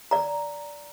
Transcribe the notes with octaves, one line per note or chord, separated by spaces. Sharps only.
D5 A#5